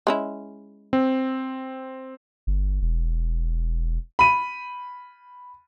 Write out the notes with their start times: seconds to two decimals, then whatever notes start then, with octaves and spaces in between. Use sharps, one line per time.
0.07 G#3 C#4 E4
0.93 C4
2.47 G1
2.82 E1
4.19 B5 D#7